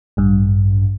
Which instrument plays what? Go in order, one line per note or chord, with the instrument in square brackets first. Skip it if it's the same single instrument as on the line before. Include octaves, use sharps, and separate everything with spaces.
[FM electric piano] A1 G2